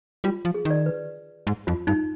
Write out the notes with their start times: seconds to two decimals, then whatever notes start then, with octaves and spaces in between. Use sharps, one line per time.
0.24 G3 F4
0.45 F3
0.54 G#4
0.65 D#3
0.70 D5
0.86 B4
1.47 G#2
1.67 F2 F4
1.87 G2 D#4